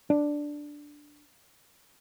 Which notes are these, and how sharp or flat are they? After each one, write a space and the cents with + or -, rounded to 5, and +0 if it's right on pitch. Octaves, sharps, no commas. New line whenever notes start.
D4 +0